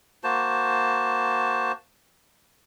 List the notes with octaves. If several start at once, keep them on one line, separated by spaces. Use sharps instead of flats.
A#3 F#4 C5 A5